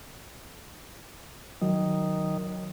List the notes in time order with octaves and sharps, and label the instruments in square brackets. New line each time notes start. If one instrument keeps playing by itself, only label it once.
[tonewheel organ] D#3 [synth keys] F#3